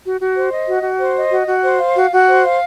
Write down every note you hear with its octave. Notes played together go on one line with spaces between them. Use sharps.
F#4
F#4
C5
D#5
F#4
F#4
C5
D#5
F#4
F#4
C5
F5
F#4
F#4
C5
F5